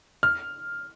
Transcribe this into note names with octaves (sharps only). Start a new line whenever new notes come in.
F6